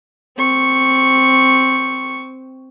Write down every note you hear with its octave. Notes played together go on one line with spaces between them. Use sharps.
C4 C#6